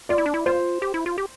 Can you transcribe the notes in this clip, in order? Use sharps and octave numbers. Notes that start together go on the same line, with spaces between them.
F4 D5
E4
D4
E4
F4 C5
G4
E4
F4
G4